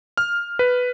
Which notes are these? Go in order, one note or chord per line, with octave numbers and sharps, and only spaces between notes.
F6
B4